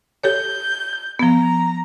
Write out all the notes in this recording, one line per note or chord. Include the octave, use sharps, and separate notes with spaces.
G4 A4 C#5 G6
F3 B3 A#5